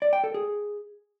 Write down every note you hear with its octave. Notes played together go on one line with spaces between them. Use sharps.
D5
G5
A4
G#4